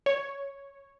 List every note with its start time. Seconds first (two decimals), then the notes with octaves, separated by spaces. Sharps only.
0.06 C#5